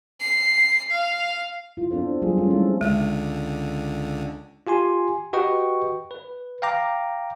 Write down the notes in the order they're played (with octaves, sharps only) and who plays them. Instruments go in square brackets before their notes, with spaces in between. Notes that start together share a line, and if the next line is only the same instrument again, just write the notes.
[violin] C7
F5
[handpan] E4 F4
B3 C4 D4 A4 C5
F#3 G3 A#3 F4 G#4
G3 A3 C#4 F4
G#3 C4 E4 A4
[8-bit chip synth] C#2 D3 [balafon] G#3
[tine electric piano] F4 G4 G#5 C6
F#4 G4 B4 D#5 G5 C#6
B4
F5 G5 A#5 D6